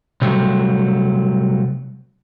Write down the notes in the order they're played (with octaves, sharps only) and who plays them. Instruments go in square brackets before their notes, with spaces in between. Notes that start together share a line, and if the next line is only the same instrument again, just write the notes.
[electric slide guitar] C3 F#3 G3 A3